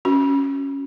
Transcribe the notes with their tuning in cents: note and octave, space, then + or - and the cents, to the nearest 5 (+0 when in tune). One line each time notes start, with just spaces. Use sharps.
C#4 +0 F#4 +0